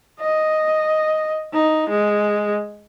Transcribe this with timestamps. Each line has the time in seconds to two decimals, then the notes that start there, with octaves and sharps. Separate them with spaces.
0.20 D#5
1.53 D#4
1.89 G#3